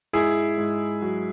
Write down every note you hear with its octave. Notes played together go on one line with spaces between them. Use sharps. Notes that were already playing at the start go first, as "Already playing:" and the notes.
G#2 E4 G#4
G#2
F#3